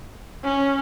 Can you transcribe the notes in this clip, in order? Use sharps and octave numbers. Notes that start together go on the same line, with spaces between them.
C#4